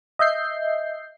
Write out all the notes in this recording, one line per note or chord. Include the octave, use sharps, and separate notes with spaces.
D#5 E5 G6 C7